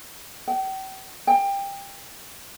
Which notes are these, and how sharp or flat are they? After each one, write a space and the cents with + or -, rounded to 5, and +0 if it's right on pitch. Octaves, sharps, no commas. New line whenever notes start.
G5 -40
G5 +20